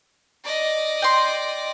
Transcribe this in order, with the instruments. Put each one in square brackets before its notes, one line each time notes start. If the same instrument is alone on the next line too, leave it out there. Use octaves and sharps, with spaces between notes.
[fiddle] D5 D#5
[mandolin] G5 C6